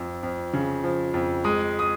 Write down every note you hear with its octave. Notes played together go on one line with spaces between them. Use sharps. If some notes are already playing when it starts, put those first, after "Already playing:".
Already playing: F2 F3
F2
C#3
F3
F2
G#3 D#6
D#6